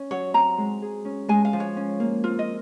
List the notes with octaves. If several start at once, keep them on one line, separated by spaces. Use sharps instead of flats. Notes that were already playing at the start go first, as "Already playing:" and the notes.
Already playing: C#4
F#3 C#5
C4 A#5
G#3
G#4
C#4
G#3 G#5
F5
F3
C#5
C#4
A#3
C4 F4
D#5